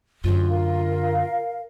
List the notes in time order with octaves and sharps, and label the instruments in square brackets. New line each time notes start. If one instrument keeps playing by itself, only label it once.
[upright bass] F#2 D3 [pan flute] F4
[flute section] A#4 F5